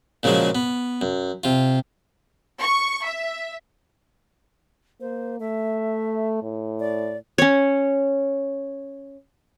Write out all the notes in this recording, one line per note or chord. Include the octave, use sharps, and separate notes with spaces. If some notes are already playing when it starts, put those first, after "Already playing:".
A#2 C#3 F3 F#3 G#3
B3
F#2
C3 F4
C#6
E5
A#3 C5
A3 E5
A2
D5
C#4 C#5